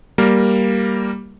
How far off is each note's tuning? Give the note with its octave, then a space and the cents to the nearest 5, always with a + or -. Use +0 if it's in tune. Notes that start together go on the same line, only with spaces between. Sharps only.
G3 +0 A#3 +0 A#4 +0